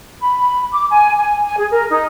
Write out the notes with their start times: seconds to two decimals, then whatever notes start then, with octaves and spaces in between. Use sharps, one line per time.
0.22 B5
0.73 D6
0.90 G#5
1.16 G#5
1.45 G#5
1.58 G#4
1.71 A#4
1.90 D#4